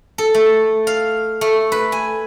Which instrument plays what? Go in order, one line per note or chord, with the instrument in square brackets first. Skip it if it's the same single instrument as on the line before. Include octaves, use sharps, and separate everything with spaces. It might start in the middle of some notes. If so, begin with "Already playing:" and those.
[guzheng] A4
A3
F5
A3
B4
G#5